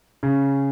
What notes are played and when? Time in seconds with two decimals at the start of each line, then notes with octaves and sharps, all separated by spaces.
0.23 C#3